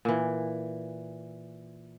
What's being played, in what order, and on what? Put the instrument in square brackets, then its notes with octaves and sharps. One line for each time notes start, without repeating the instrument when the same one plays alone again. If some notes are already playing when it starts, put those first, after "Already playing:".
[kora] A#2 E3